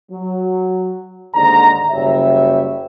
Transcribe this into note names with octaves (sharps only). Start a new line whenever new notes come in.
F#3
D#2 G#2 D3 A#5
F#1 G3 C#5 E5